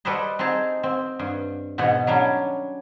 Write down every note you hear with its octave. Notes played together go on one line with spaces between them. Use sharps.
G3 A4 B4 C5 D#5
C4 D#4 G#4 A5
C4
G2
E2 G#2 B2 D#5 F#5
F#3 G3 C#4 D4